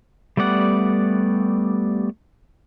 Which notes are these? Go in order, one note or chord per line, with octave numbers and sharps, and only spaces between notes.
G3 A3 B3 D5 F#5